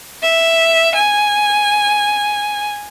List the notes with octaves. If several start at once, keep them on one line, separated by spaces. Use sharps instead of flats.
E5
G#5